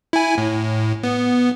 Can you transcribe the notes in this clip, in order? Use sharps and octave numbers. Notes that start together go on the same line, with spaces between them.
E4 G#5
A2
B3